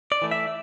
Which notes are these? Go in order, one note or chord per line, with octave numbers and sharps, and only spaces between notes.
D5
E3 A3
E5